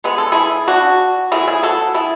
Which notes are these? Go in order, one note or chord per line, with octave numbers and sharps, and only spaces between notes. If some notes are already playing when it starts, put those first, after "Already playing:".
D3 G#3 B3 G#4
A4
E4 G#4
D4 F#4
B2 A3 E4 G#4
E4 G#4
F#4 A4
E4 G#4